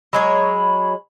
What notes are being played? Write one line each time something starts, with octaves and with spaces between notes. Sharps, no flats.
F#3 G#3 C#5 B5